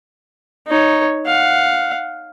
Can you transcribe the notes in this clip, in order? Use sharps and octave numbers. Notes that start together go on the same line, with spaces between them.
D#4 C#5
F5 F#5